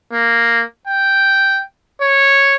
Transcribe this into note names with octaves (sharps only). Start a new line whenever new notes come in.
A#3
G5
C#5